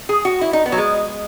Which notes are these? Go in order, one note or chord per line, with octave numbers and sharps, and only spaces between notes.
G#4
F#4
E4
D#4
B3
F#3
G#3